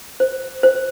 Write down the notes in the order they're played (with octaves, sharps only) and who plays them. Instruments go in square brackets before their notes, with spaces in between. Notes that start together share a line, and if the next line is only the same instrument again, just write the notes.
[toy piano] C5
C5